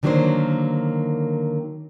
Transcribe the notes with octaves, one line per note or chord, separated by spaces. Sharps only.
D3 D#3 F#3 A#3 D4 C5